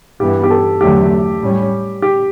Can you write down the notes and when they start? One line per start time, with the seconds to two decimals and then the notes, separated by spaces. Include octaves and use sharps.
0.20 G2 E3 B3 G4
0.44 G4
0.51 A4
0.81 E2 D3 F#3 A3 G4
1.42 A2 G3 C#4
2.02 G4